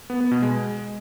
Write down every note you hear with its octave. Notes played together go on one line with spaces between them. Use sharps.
B3
B3
B2
G#3